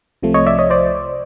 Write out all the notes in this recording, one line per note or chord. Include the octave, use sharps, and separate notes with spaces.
C2 C3 F3 A3
C#5 D#5
D5 E5
C#5 D#5
C5 D5